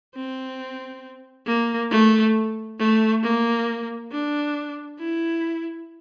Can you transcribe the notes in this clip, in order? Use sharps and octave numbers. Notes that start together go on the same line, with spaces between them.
C4
A#3
A3
A3
A#3
D4
E4